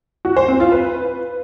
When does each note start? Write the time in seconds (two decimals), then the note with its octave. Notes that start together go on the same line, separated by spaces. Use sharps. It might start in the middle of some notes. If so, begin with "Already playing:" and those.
0.25 F#4
0.36 C5
0.48 C4
0.60 F4
0.72 B4